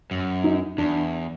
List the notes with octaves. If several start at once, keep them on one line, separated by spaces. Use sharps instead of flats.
F#2
D#4
E2 D4